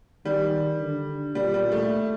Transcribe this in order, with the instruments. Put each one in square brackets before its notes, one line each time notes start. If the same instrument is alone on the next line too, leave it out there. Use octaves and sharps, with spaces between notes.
[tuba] D#3 [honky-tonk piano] G3
[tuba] D3
[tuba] A#2 [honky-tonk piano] G3
[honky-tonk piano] G3
A3